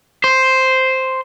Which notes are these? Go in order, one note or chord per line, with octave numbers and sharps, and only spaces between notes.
C5